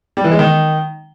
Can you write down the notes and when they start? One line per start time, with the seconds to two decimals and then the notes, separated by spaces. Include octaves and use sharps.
0.17 G3
0.24 E3
0.32 G#3
0.39 D#3